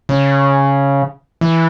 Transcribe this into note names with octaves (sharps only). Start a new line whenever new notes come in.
C#3
E3